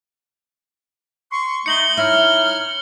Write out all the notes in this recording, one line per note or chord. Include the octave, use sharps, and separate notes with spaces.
C6 C#6
A3 D#4 C#7 F#7 G7
D#4 E4 C#5 F6